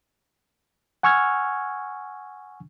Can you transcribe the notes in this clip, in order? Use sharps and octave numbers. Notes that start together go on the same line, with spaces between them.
F#5 G#5 C#6 E6 F6 G#6